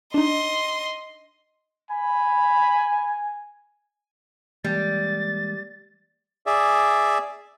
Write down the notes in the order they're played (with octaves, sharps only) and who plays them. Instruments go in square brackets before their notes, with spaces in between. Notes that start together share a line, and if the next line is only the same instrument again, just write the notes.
[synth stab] D4 D#4 [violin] D#5 C6
[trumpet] G#5 [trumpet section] B5
[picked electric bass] E3 G#3 A#3 [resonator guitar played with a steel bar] G3 [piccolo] A6
[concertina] G#4 D5 E5